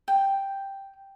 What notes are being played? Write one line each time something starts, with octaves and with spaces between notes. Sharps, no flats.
G5